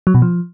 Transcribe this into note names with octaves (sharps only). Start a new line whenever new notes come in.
F#3
B2
F3